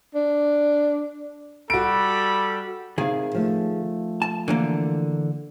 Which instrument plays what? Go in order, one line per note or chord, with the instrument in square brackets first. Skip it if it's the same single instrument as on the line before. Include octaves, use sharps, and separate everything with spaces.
[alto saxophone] D4
[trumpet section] G3 A4 B5 [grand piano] F#4 D7
[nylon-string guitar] C3 F5 [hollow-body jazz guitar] D#3 G#4
[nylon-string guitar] F3 A3
[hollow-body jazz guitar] A5
D3 E3 A#3